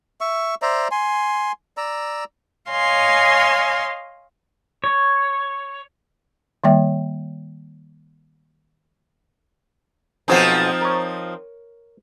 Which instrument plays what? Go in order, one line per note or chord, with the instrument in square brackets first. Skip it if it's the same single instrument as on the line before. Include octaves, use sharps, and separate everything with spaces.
[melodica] E5 C#6
C5 D5 E5 A#5
G#5 C6
D5 A#5 E6
[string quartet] C#5 D#5 F5 G#5 C6
[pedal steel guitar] C#5
[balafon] D#3 G3 A#3 C#5 E5 G5
[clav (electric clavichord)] B1 B2 G#4 [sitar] F3 C4 D#4
[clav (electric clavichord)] A#4 C#5